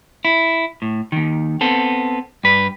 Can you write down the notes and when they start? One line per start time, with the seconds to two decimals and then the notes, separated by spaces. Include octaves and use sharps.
0.25 E4
0.82 A2
1.12 D#2 D#3
1.61 B3 C4 A4
2.44 G2 B4